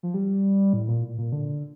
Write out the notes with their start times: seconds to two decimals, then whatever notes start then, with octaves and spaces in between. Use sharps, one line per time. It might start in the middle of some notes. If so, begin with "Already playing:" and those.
0.03 F3
0.14 G3
0.73 A2
0.88 A#2
1.18 A#2
1.32 D3